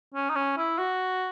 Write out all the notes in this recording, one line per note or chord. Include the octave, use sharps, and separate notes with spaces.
C#4
D#4
C#4
E4
F#4